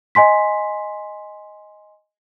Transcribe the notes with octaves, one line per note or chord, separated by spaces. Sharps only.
D#5 G#5 C6 B6